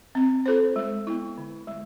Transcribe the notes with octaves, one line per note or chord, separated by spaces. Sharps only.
C4
F4 A4 C5
G#3
B3 E4
D3
G#3